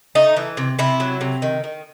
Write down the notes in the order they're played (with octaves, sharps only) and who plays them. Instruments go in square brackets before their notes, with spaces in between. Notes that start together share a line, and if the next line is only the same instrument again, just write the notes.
[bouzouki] A3 D#4
E3
C3
C3 E4
F#3
C3
D#3
D#3